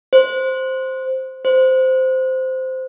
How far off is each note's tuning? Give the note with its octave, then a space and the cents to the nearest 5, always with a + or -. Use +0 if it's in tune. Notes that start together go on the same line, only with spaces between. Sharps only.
C5 +0
C5 -10